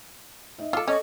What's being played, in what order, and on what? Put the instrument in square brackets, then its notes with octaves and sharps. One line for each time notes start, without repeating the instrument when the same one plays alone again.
[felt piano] D#4 D#5 E5
[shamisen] F4 A4 [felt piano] A5 D6 E6
[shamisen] C#4 [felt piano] A4 [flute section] D#5 C#6